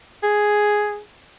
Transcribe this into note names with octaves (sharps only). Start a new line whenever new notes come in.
G#4